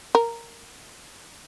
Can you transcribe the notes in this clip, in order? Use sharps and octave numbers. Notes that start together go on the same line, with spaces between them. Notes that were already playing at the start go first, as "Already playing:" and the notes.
A#4